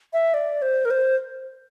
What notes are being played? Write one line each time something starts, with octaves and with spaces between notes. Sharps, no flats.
E5
D5
C5
A#4
C5